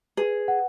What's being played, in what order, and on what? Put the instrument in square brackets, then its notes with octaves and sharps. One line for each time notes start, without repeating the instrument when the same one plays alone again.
[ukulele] G#4 [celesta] B4
[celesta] F#5